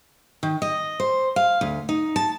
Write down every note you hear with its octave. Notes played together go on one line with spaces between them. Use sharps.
D#3
D#5
C5
F5
D2
D#4
A5